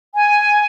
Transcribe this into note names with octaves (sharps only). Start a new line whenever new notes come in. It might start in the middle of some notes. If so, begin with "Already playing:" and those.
G#5